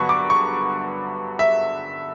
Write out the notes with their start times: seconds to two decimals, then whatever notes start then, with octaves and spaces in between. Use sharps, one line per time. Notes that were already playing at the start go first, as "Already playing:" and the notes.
Already playing: G2 D3 F#3 B3 B5 C#6
0.09 D6
0.30 C#6
1.39 E5